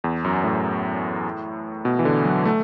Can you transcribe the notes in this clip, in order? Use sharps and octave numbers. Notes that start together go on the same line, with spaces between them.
E2
F#2
A2
B2
E3
D3
F#3
A3